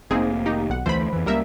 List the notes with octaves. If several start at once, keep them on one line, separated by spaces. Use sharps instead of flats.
F1 A#3 C4 D#4 G#4
D#3 D#4 G4
B1 F#5
D2 E3 A3 C5 B5
F2 E3
C#2 G3 A#3 A#4 E5